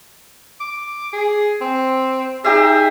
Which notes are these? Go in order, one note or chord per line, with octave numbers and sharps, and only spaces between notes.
D6
G#4
C4
D#4 G4 G#4 E5